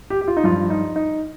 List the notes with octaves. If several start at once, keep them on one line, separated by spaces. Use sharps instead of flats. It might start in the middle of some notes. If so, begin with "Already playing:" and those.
G4
G4
F4
D#4
G2 F3 F4
D#4
D#4